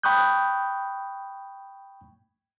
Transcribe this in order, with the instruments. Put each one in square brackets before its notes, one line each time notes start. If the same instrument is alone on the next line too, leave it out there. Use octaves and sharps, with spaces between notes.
[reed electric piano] G5 B5 C#6 D#6 F#6 G6